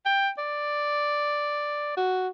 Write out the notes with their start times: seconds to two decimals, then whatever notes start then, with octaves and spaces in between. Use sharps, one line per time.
0.06 G5
0.38 D5
1.97 F#4